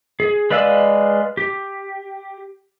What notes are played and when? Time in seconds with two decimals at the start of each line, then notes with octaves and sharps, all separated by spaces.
0.20 G#4
0.51 G#3 B4 D5 F5 E6
1.37 G4